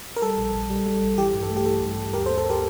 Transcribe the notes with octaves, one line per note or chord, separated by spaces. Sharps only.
A#4
G3 A4
A#1
A#1
G3
G3
A#1
E3 G4
G2
A4
A3
G4
E3 A4
G2
G2
D2 G4 A#4
A4 C5
A#3
A4 C5
A#3 G4 A#4